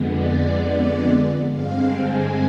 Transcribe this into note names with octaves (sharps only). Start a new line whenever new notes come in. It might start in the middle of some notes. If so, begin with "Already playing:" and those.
Already playing: F2 D3 G#3 B3
D5
D5
G2 D3 G#3 C4 F5
G#5